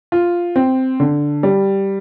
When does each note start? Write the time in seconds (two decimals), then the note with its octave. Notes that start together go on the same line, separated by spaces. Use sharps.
0.12 F4
0.56 C4
1.00 D3
1.43 G3